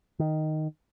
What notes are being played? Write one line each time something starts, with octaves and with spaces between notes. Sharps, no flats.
D#3